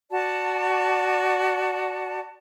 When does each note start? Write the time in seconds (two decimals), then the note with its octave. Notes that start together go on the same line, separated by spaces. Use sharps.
0.11 F#4 D5 A5